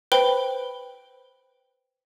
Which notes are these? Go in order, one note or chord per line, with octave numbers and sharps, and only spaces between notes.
B4 C5 G5 B5 G7